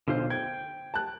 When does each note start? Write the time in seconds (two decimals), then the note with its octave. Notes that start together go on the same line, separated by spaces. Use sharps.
0.08 B1 D3 F4 C5
0.30 G5 G#6
0.94 A5 F#6